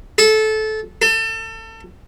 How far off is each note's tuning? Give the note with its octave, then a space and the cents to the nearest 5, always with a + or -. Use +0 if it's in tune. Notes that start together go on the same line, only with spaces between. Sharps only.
A4 -20
A4 +30